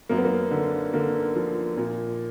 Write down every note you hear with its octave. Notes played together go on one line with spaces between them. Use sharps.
F#2 A#3
B3
A#3
D3
D3 A#3
F3
A#2